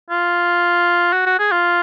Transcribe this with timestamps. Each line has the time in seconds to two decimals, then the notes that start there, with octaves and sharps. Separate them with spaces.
0.10 F4
1.12 F#4
1.26 F#4
1.39 G#4
1.51 F4